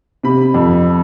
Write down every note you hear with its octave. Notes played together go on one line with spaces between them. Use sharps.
C3 B5
F2